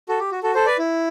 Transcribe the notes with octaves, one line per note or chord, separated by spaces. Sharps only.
F#4 A4
G4
F#4
F#4 A4
A4 C5
B4 D5
E4